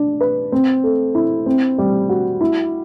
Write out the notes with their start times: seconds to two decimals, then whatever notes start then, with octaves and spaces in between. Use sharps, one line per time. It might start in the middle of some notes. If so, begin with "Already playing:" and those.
Already playing: D4
0.21 B4
0.52 C4
0.84 A3
1.15 E4
1.46 C4
1.78 G3
2.09 F#4
2.41 E4